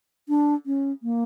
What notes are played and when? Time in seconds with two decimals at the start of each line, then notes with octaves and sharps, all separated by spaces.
0.29 D4
0.66 C#4
1.03 A#3